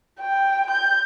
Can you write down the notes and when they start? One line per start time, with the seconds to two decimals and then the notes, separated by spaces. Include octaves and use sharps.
0.21 G5
0.70 G6